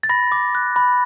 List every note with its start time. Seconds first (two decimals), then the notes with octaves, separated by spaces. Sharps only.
0.03 A6
0.09 B5 A#6
0.32 D6
0.55 F#6
0.76 B5